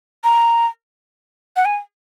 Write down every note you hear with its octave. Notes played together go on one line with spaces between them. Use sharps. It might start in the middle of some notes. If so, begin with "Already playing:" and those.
A#5
F#5
G#5